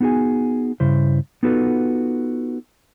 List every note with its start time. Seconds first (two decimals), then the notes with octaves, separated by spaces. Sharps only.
0.01 B3 D#4 F#4 G#4 G#5
0.80 G2 C#3 E4 C5
1.43 B3 D#4 F4 F#4 A4 B4